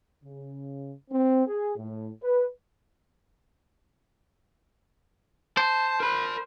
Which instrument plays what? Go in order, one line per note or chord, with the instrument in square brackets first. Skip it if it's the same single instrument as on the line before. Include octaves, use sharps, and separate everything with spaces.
[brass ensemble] C#3
C4
G#4
A2
B4
[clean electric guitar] C5 [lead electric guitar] A5
[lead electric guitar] A#4 B5